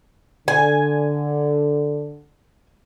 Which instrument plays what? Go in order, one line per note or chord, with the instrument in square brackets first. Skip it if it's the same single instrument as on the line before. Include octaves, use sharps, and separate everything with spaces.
[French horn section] D3 [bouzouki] G#5